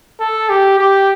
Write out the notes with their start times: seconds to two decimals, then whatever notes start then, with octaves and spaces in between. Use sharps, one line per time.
0.20 A4
0.49 G4
0.79 G4